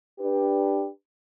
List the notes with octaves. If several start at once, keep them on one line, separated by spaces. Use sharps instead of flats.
D4 G4 B4